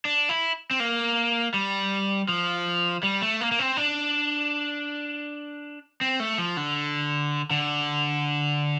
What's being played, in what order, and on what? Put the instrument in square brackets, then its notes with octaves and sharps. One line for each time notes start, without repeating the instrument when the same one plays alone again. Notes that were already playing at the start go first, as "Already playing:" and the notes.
[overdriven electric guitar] D4
E4
C4
A#3
G3
F3
G3
A3
A#3
A#3
C4
D4
C4
A3
F3
D3
D3